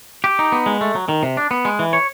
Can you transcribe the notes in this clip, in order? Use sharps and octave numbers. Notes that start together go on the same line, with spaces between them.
G4
D#4
B3
G#3
A3
F#3
D#3
C3
D4
B3
G#3
E3
C#5